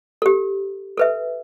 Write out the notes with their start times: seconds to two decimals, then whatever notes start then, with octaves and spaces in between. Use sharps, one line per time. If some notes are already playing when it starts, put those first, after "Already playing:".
0.22 G4 A4
0.97 A4 B4 E5